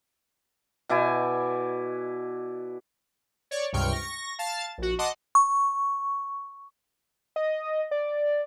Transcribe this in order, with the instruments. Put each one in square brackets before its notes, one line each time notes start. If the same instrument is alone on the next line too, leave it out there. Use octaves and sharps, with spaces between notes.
[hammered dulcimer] B2 E4 D5 G#5
[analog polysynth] C#5 D5
C#2 G2 C3 G5 C#6 F6
C#6 A#6
F5 A5 A6
A#1 F#4
D#5 F#5 A5 C6 D6 D#6
[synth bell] C#6
[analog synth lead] D#5
D5